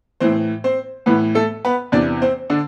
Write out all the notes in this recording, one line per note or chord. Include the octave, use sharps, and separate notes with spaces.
A2 E3 C4 C5
C4 C5
A2 E3 B3 B4
A3 A4
B3 B4
E2 C3 E3 D4 D5
C4 C5
D3 D4